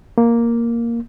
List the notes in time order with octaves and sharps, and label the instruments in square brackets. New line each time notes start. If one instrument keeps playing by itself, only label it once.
[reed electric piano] A#3